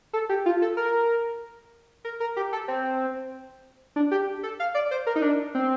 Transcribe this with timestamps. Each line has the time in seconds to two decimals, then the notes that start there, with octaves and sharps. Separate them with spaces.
0.13 A4
0.29 G4
0.46 F4
0.62 A4
0.77 A#4
2.05 A#4
2.20 A#4
2.37 G4
2.53 A4
2.68 C4
3.96 D4
4.11 G4
4.43 A4
4.60 F5
4.74 D5
4.91 C5
5.06 A#4
5.16 D#4
5.22 D4
5.55 C4